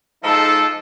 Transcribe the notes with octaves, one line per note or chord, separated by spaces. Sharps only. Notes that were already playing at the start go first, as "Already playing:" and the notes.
F3 G#3 D#4 A4